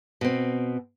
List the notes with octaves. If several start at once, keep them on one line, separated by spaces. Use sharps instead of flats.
B2 C4